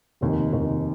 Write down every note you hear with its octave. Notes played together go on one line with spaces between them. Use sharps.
F1 D#2 D#3
F1 D#2 D#3